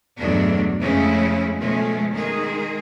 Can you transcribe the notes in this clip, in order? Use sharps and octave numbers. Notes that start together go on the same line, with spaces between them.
E2 G2 B2 F#3 A3 D4
F2 C#3 G#3 A3 C#4 E4
B2 F3 G#3 A3 C#4
D#3 G#3 G#4